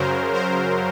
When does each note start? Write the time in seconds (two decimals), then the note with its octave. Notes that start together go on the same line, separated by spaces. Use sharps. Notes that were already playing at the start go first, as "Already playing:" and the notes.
Already playing: F#2 C#3 F#3 A#4 C5
0.34 A#4 C5